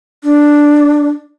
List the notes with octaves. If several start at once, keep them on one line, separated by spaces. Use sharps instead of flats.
D4